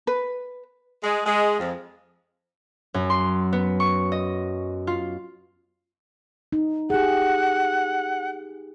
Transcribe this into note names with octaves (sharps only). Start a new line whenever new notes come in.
B4
G#3
G#3
F2
F#2
C6
B3
C#6
D#5
F4
D#4
G4 G#4 F#5